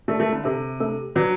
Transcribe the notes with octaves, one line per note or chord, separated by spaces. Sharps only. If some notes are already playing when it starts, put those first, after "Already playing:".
A3 D4 A4 D5
A3
D3
C3 D4 A4 E5
A3 D4 A4
F#3 D4 G4 B4 D5 F#5